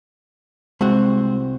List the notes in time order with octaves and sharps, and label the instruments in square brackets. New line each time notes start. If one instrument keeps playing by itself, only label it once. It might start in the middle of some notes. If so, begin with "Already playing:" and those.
[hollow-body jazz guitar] C2 C4 F#4 [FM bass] G#3